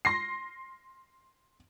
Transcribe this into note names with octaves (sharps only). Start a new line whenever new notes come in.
C6 A#6 C7